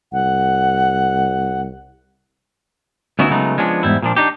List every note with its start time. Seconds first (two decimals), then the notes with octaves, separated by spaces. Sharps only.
0.13 C2 F#5
3.19 D2 B3 C#4 D#4 E4 F#4
3.30 C#3 F#3 G#3 A3 B3 D#4
3.57 F3 G#3 B3 C#4 D4
3.83 E2 G#2 G3 E4
4.03 A#2 F3 D4
4.16 D4 D#4 G4